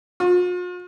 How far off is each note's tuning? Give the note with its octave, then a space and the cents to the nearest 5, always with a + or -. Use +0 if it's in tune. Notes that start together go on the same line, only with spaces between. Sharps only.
F4 +45